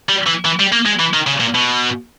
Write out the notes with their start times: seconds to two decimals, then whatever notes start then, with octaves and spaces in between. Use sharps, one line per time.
0.09 G3
0.26 E3
0.45 E3
0.59 G3
0.72 A#3
0.85 G#3
0.99 E3
1.13 D#3
1.27 C#3
1.40 A#2
1.54 B2